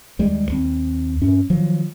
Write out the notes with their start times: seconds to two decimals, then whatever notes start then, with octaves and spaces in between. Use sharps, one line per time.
0.19 D#2 G3 G#3
0.50 D#2 C4
1.21 G2 C#4
1.50 D#3 F3 F#3